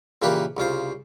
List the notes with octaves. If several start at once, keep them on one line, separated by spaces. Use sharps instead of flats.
A#2 C#3 E3 A#3 G4 B4
C2 C#3 F4 C5